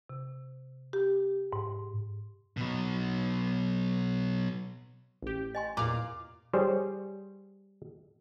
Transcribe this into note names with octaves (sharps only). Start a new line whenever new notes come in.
C3
G4
G#2
B2 F#3
A1 G4
D#5 G#5 C6
E2 A#2 F5 A#5 D6
G3 G#4 C5 C#5